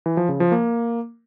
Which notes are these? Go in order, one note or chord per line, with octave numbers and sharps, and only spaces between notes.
E3
F3
C#3
F3
A#3